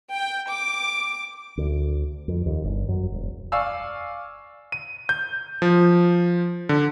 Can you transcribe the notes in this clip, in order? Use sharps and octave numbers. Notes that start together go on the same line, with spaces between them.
G5
D6
D2
F2
D#2
G1
F#2
E1
D5 F5 G#5 C#6 E6
D#7
G6
F3
D3